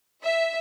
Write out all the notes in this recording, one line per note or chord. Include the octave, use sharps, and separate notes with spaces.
E5